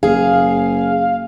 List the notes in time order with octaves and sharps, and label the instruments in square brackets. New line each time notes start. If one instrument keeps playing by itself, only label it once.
[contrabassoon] F#1 [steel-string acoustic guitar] G#4 [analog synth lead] F5